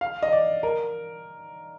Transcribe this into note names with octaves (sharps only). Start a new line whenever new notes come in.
F5
D#5
D5
A#4